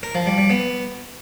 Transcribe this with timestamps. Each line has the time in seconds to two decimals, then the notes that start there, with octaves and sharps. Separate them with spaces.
0.03 A#4
0.15 F3
0.26 G3
0.38 G3
0.50 B3